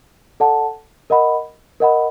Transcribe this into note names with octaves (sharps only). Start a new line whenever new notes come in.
A4 D5 F#5 A5
A#4 D#5 F#5 B5
A#4 D#5 F#5 B5